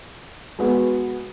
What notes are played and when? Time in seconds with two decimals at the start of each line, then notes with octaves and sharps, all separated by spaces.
0.59 G#3 B3 F#4